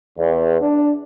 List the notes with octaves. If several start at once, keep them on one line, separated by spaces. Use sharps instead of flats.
E2
D4